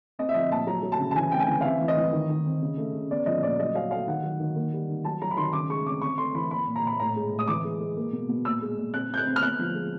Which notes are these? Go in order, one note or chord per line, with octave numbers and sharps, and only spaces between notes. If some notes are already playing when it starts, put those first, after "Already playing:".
C4 D#5
E5
F3 D#5
A#2 A5
F#3 A#5
F#3
A5
C#3
A5
E3 G#5
C4 G5
G#5
E3
F5
C4 E5
E3
D#5
E3
D#3
D#3
C4
C#3
A3
C#3
B3 D5
F3 D#5
A#2 D5
F#3 D#5
F#3 F5
A3 F5
D#3 F#5
F#3
D#3
A#3
G3
D#3
F#3 A5
F#3 A#5
B5
D#3 C6
C#3 D6
G#3 C#6
C4 D6
C4 C#6
A3 C6
E3 B5
A#3 B5
A#2
A#5
A#2 B5
A2 A#5
G#3
A2
D#6
E3 D6
G#3
G#3
A#3
B2
B2
A#2 E6
G#3
A#2
C4 F#6
C4 G6
F#6
C4
F6
B3 F#6
F3
G#3